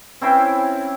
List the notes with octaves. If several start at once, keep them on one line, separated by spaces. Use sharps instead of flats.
C4 C#4 E4 C5